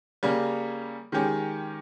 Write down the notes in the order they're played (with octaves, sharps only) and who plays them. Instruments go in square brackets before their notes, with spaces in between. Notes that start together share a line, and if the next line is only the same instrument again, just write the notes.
[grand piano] C#3 G3 A#3 C#4
D#3 G#3 C#4 G4